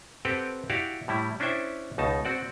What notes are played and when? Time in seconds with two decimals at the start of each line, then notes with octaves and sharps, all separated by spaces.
0.25 C4 G4 A4 B4 F#5 G5
0.70 E4 F#4 G4 D5 F5
1.08 A2 G3 E4
1.40 C#4 D4 E4 C5 E5 G5
1.98 C#2 B2 D#4 A5
2.25 C4 F#4 D5